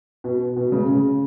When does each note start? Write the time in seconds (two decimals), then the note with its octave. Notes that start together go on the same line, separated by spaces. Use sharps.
0.24 B2
0.57 B2
0.72 C#3
0.89 C#3